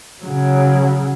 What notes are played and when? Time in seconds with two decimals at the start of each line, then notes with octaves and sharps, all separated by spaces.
0.22 C#3 F#3